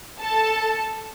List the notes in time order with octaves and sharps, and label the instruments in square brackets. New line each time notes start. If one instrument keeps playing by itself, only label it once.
[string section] A4 A5